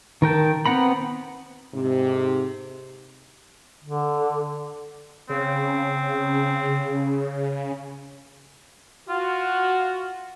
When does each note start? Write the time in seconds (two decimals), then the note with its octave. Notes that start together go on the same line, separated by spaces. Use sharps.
0.22 D#3 A#4 G5 A5
0.66 B3 C4 F#5 A#5 B5
1.74 G#2 C3
3.84 D3
5.29 C#3 C4
9.09 F4 F#4